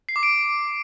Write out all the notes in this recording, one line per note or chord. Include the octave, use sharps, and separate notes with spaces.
C7
D6
D7